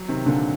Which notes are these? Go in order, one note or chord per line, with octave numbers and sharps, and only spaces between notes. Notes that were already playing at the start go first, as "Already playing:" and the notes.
Already playing: F#3
C3 D#3
A#2 D3